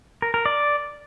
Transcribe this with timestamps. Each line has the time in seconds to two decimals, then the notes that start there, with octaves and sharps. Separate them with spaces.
0.22 A#4
0.34 A#4
0.46 D5